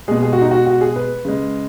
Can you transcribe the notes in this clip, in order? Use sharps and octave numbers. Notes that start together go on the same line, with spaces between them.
B2 G#3 G#4
G#4
F#4
D#4
F#4
F#4
G#4
B4
C#3 G#3